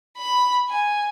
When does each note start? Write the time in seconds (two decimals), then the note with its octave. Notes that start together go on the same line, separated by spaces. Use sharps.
0.18 B5
0.69 G#5